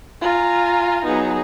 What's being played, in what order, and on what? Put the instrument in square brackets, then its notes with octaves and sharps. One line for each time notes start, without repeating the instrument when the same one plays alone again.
[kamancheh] F4 [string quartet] G#5 A#5
[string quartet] F#3 B3 [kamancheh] D#4 G#4